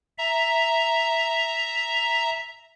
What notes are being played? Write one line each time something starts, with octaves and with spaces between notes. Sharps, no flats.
E5 A#5